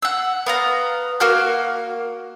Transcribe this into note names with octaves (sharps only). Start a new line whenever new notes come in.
F#5 E6
B3 F5 A#5
A#3 F#4 F6